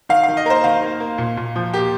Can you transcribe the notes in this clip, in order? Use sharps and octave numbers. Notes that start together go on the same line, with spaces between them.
D#3 F5
D#3 F5
D#5
A#3 A#4 C5
D#3 F5
A#3
A#3
A#2
A#2
F3
A#3 G4